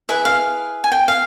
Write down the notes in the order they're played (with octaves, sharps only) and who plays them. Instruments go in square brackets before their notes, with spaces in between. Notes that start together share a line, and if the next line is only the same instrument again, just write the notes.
[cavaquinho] E4 G#4 B4 E5
F5
G#5
G5
F5